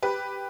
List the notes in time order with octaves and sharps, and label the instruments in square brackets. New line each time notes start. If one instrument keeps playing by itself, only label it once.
[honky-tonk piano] G4 B4